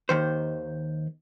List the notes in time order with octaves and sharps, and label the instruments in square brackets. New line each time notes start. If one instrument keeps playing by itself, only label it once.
[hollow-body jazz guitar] D#2 D#3 C5